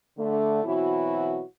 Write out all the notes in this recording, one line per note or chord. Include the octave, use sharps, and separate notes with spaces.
D3 A3
B2 E3 F#3 C4 E4 F#4